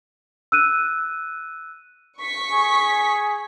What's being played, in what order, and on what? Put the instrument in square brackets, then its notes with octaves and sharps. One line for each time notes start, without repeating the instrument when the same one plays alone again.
[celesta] E6 F#6 D#7
[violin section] C#6 B6
[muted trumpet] G#4